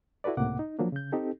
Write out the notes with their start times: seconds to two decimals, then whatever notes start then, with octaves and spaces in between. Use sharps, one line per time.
0.24 E4 F#4 A4 B4 D5
0.37 C#2 A2 C3 A#3 F#5 D6
0.59 D#4
0.79 F3 F#3 A#3 D4
0.92 C#3 G6
1.12 C4 D#4 G4 A4